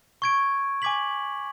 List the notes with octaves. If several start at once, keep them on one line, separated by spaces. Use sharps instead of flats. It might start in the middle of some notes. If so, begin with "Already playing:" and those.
C#6 G#6 D7
G#5 D6 G#6 B6 F#7